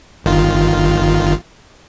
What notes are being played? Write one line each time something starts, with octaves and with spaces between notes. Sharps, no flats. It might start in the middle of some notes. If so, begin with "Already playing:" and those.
G1 D#3 F4